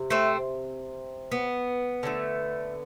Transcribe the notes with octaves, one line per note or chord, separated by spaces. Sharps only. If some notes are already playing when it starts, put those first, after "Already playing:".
Already playing: C3
A3 C4
B3
D3 F#3 A3